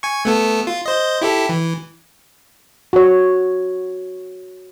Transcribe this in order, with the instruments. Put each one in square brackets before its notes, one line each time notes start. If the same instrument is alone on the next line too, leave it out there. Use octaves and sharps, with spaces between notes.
[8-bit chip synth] G#5 C#6
A3 B3 A4
F4
C5 D#5
E4 G4 A4
E3
[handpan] F#4 C#5